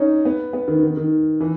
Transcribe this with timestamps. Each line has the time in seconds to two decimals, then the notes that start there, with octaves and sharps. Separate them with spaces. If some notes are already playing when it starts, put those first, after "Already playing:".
Already playing: C#4 D#4
0.25 B3
0.53 B3
0.68 D#3
0.83 D#3
0.97 D#3
1.40 E3